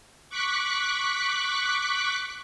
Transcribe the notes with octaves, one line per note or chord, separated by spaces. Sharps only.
C#6 D6 F#6 B6